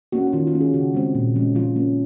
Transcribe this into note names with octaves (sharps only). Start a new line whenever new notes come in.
A#3 C#4 F#4
F#4
D#3 F4
F4
A#3 C#4
G#4
C#3 F#4
G#3 C4
A#2
F3 G#3 C#4
F3 F4
A#3 C#4